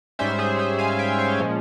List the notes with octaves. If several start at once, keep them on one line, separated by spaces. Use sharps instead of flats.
G#2 G3 C#4 C5 E5
G#4 C5
G#4 C5
F5 G#5
E5 G5
C#5 F5
A#2 F3 G#3 C#4